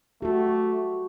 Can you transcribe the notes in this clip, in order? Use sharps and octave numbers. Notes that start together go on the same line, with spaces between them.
A3 F#4 G4